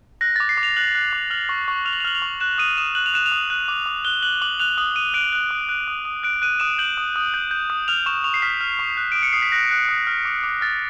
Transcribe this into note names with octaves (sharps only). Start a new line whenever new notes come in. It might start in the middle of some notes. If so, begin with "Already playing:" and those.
F#6 A#6
D6 A6
C7
D6
F7
F#6 F#7
F#6
D6
F6 F#7
C#6
C#6
F6 F7
F#7
F7
F6 F#7
F7
C#6
F#6 E7
D#6 D#7
D#6 E7
F#6 F#7
F7
F#6 E7
F7
D#6
F#6
D6
D6
F#6 G7
F#6 F#7
D6 F#7
F#6 F7
D#6 F#7
D#6 D#7
F#6 D7
F#6
D#6
F#6
D#6
D#6
F#6 D7
F#6 D#7
D#6 E7
G6 F#7
D#6
D#6
G6
G6
D#6
F6 F7
C#6 E7
C#6 F7
C7
F6 B6
F6
C#6
F#6
D#6 D7
C#7
D#6 C7
B6
F#6 A#6
F#6
D#6
F6
D6
D6
F6 A6